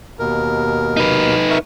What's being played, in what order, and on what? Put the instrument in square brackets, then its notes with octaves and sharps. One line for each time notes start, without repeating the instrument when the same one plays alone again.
[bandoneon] D#2 B2 A#4
[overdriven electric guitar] D#4 B4
[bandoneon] A#4 E5 C#6